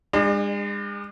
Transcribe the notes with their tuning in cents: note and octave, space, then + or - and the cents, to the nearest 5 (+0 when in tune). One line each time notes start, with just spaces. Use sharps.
G#3 -40 D4 +35